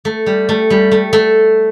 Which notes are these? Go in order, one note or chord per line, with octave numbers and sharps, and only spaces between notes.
A3
G3
A3
G3
A3
A3